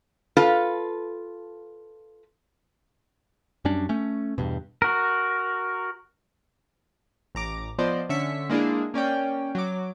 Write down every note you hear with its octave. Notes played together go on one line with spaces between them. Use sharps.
F4 A4 B4 F5
F#2 G3 C#4 D4
A3 C#4
E2 G2 B2
F#4 A#4
A1 A#5 D6
F3 B3 C5 D5 D#5
D3 C#4 E5 B6 C#7
G#3 A#3 D4 E4 G#4
A#3 C#4 D5 G5
F#3 D6